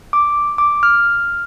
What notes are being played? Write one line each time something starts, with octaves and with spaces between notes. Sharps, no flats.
D6
D6
F6